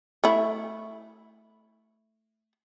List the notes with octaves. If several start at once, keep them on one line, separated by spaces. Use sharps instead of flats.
A3 E4